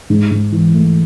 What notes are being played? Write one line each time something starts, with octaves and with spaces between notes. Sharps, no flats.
G#2
G#2
E3
A3